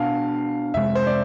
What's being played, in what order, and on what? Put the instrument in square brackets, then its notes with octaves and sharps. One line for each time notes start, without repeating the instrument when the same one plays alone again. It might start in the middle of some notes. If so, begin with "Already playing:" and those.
Already playing: [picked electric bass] B2 B3 D4 [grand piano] F5
[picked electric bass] F2 C3 G#3 [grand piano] E5
[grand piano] C5
D5